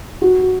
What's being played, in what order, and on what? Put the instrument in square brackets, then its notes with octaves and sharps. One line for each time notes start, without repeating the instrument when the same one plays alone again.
[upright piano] F#4